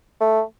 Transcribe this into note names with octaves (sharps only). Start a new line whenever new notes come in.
A3